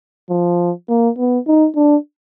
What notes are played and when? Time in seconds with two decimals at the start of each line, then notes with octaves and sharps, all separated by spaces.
0.30 F3
0.89 A#3
1.18 B3
1.47 D#4
1.76 D4